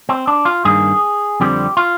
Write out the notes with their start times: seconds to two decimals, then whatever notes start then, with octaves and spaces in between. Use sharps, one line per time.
0.09 C4
0.27 D4
0.45 F4
0.65 G2 D#3 A#3 G#4
1.40 F2 D3 G3 C4 G4
1.77 F4